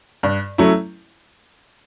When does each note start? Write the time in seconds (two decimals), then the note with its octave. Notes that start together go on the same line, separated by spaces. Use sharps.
0.23 G2
0.58 F#3 A3 C#4 E4